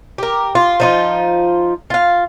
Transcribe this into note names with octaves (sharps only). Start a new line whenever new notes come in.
G4 A#4
F4
F3 D#4 F4
F4 F5